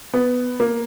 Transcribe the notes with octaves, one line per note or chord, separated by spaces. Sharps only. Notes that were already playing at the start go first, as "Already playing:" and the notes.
B3
A#3